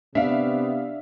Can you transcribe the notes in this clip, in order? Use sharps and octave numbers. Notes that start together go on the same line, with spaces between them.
C3 B3 D4 E5 F5